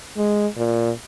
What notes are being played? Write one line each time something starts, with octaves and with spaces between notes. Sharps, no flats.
G#3
A#2